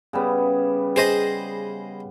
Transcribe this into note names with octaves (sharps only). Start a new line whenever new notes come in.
C#3 G3 B3
G#4 C5 D#5